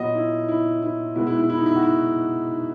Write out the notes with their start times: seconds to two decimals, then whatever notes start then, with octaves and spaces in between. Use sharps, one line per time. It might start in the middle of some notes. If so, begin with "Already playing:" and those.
Already playing: A#2 F#3 B3 D#5
0.15 E4
0.48 E4
0.83 E4
1.16 B2 G#3 B3 E4
1.27 E4
1.38 E4
1.50 E4
1.57 D#4
1.66 E4
1.75 F#4
1.83 E4